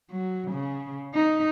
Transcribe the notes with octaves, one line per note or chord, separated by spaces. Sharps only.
F#3
C#3
D#4